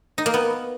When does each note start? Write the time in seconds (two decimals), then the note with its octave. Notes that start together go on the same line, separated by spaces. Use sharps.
0.18 D#4
0.26 A#3
0.34 B3